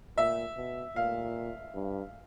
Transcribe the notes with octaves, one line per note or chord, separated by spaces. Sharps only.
A#2 E5
B2
A#2 F5
G2